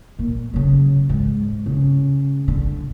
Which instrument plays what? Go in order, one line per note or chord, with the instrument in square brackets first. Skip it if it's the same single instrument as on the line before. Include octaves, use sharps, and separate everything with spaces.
[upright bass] A#2
C#3 F#3
G#2
C#3
D3